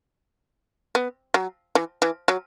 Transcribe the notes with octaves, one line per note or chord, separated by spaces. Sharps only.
B3
F#3
E3
E3
F#3